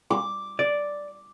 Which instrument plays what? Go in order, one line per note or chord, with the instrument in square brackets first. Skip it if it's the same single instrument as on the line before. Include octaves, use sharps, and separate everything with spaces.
[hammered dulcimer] D6
[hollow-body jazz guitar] D5